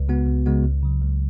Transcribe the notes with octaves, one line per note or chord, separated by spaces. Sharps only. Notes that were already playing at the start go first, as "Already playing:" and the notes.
Already playing: C#2
C#3 G#3 B3 F#4
C#2
C#3 G#3 B3 F#4
C#2
C#3 F#3
C#2